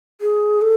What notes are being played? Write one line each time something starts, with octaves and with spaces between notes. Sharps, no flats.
G#4
A4